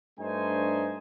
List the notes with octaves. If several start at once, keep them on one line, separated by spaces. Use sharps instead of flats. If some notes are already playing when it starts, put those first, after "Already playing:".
G2 A3 D4 D#4 C5 G#5